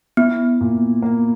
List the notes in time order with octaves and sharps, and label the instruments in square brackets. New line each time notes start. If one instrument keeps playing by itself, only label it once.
[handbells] B3 [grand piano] E4
[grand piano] A#2
A#3